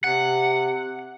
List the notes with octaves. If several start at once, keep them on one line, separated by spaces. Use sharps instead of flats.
C3 F#5